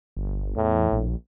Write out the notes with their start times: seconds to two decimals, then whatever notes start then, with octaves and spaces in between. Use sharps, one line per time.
0.17 G1
0.56 E2 A2
0.92 A#1